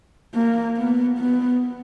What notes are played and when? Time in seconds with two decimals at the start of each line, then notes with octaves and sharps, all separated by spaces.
0.35 A#3
0.77 B3
1.19 B3